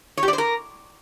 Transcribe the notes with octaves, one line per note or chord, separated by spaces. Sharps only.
C#5
G4
D5
C5
A#4